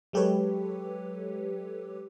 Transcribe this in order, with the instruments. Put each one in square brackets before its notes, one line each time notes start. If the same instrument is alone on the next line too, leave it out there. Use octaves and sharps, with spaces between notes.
[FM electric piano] F#3 G#3 G4 A4 B4 C#5